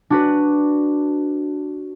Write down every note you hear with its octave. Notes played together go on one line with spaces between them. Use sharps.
D4 F#4 B4